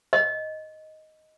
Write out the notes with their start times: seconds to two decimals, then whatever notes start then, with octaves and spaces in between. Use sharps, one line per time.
0.13 D#5